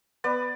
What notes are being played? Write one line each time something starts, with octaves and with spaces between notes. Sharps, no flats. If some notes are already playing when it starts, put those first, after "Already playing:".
B3 B4 D5